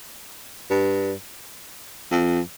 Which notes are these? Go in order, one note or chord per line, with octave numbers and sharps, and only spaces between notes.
G2
F2